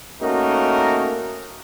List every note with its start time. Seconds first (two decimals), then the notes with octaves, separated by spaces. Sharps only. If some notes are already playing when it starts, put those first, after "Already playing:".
0.22 A3 A#3 C#4 D#4 F#4 A#4